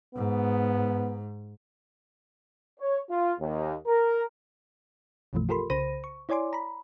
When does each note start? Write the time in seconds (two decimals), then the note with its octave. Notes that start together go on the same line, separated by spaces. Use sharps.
0.15 G#2 B3
2.80 C#5
3.10 F4
3.40 D#2
3.87 A#4
5.33 B1 F#2 B2 E3 F3 A3
5.49 F4 G4 A4 A#4 B5 C6
5.70 C2 C#3 C5 B5 A#6 D#7
6.04 C#6
6.29 E4 C#5 D5 G#5 C6 D6
6.53 A#5 B5